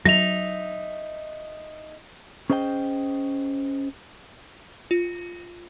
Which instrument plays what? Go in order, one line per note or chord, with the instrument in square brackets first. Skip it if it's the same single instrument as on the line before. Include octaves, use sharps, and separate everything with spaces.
[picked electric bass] F#3 [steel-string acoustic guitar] D#4 E5 [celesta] A#6 F7
[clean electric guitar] C#4 G#4 C5 D#5 F#5 G5
[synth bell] F4